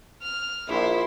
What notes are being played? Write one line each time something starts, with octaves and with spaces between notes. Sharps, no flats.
F6
A#1 E4 C6